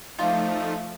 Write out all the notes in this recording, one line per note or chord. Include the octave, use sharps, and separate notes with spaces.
F3 A3 D#4 F4 D5